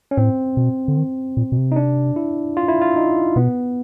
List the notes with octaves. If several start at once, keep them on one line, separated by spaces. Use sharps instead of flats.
C#4
A2 C4
B2
D3
D#3
A#2
B2
C3
D#4
D4
E4
F4
E4
F4
D#4
B2 B3